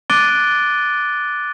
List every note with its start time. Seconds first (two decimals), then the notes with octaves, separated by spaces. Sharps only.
0.10 D6 F#6 A6 D7 D#7 G7